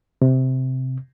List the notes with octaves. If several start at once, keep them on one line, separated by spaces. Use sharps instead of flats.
C3